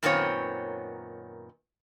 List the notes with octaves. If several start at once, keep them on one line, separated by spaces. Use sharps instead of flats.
F#2 A#2 D#3 B3 C4 C#5